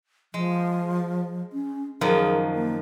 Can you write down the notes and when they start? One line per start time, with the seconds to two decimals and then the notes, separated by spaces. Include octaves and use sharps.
0.34 F3 G#3
1.53 C#4
2.01 F#2 D#3 F3 G#4
2.54 A#3